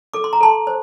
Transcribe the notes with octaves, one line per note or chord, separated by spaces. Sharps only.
A4 D6
C6
A#5
A4 A5 C6
C5